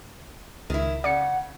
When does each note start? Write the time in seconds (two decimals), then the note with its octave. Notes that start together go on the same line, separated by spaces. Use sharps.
0.70 C#2 D#3 E4
1.04 C#3 D5 F#5 C#7